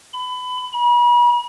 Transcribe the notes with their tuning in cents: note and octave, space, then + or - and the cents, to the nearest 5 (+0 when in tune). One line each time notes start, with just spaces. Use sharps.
B5 +25
B5 -40